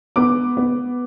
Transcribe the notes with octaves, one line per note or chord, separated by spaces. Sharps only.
B3 D6
B3